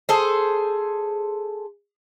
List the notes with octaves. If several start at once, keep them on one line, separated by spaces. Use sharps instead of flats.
G#4 A4 C5